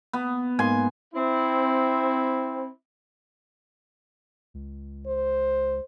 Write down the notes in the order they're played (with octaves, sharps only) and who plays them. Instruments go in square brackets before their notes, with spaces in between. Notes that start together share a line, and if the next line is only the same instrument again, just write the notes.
[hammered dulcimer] B3
[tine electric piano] G#2 A#3 C6 [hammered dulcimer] G#5
[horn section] C4 E4
[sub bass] C#2
[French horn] C5